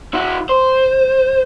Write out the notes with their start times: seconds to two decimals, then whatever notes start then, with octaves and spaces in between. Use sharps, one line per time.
0.14 E4 F#4
0.49 C5